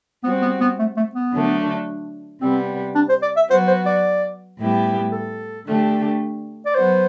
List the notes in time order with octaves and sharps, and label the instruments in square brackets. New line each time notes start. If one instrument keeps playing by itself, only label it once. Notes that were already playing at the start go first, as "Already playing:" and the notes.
[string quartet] G3 C4 F#4 [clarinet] B3
[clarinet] B3
B3
A3
A3
B3
[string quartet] D3 F#3 A3 D4
[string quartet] C3 G3 B3 [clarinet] C4
[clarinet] D4
C5
D5
E5
[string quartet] F#3 B3 F#4 [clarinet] C5
[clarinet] C5
D5
[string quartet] A2 G3 B3 E4 G4
[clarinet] A4
[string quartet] D3 A3 D4 G4
[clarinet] D5
[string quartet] F#3 B3 F#4 [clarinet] C5